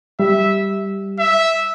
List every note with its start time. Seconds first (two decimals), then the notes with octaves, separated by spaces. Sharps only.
0.20 G3 E5
1.19 E5